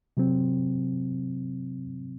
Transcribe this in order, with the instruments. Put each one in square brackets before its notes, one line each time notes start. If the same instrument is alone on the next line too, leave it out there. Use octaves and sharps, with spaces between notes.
[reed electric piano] C3 F#3 C4